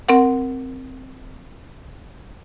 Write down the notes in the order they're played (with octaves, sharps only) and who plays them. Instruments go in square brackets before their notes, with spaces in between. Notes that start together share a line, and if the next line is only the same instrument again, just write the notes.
[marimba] C4 A#4 F#5